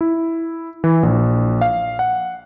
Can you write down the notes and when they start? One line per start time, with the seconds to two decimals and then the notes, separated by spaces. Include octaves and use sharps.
0.01 E4
0.84 E3
1.03 A#1
1.61 F5
1.99 F#5